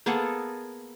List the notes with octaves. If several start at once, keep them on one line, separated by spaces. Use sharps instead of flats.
A#3 B3 G#4 A4